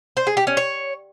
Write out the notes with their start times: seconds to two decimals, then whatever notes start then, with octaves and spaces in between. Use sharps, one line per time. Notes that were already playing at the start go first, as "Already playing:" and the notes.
0.17 C5
0.27 G#4
0.37 G4
0.47 C#4
0.57 C#5